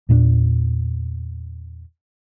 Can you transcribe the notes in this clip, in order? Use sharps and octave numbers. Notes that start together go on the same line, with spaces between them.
E2 A#2 A3 D4